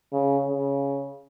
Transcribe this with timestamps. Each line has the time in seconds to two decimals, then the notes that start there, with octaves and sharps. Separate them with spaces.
0.13 C#3
0.48 C#3